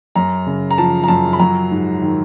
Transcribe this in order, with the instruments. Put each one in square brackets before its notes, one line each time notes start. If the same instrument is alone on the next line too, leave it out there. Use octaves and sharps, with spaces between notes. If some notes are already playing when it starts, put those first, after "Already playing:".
[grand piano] F#2 A#5
C#3
A#5
F3 A5
A#5
F#2 A5
B5
F#3 A#5
G#2
D#3